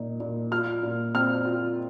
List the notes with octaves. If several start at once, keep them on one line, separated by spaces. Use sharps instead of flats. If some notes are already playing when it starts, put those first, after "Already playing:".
Already playing: A#2 D#4
A#2
F4 F6
A#2
C4 F6
F4